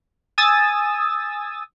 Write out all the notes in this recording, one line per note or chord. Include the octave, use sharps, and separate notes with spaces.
G#5 D#6 E6 A6